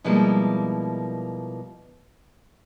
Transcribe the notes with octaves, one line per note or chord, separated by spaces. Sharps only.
B2 F3 G3 G#3 A#3 E4